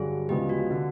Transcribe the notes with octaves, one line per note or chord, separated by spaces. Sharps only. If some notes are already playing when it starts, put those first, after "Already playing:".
Already playing: G2 D3 F#3 G#4
D2 C#3 F3 G#3 B3 G4
F#4
D3